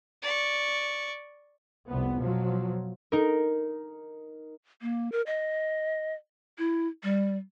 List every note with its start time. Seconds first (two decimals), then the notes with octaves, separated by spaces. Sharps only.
0.22 D5 C#6
1.89 F1 C2 C3 B3
2.18 B2 F3 F#3
3.12 D#4 A#4
4.82 A#3
5.12 A#4
5.26 D#5
6.58 E4
7.03 G3